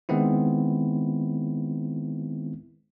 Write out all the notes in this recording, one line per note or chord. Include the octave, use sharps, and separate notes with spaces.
D#3 G#3 B3 C4 E4